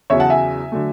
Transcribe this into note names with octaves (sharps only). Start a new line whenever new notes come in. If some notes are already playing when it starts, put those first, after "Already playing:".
E2 C#3 F#3 C#5 E5
F#5 A5
E5 G#5
D3 F#3 A3